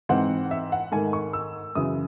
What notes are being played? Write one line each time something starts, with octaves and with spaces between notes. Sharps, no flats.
G#2 E3 C4 F#5
E5
F#5
G#2 D#3 A3 G#5
C#6
E6
F#2 C#3 E3 D#6